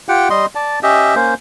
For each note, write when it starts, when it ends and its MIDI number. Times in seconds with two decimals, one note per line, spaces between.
0.09 0.29 65
0.09 0.29 67
0.09 0.29 78
0.09 0.29 79
0.30 0.46 55
0.30 0.46 75
0.30 0.46 84
0.55 0.79 74
0.55 0.79 81
0.83 1.15 61
0.83 1.15 67
0.83 1.15 75
0.83 1.15 76
1.16 1.34 58
1.16 1.34 61
1.16 1.34 72